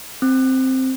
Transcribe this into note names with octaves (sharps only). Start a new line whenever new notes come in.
C4